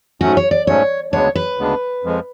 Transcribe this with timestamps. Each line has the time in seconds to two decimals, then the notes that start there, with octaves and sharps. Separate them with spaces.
0.21 G#2 F#3 A3 C#4 F#4
0.37 C#5
0.51 D5
0.67 G#2 F#3 A3 C#4 C#5
1.13 D2 C#3 G#3 B3 D4 C#5
1.35 B4
1.58 D2 C#3 G#3 B3 D4
2.03 F2 F3 G#3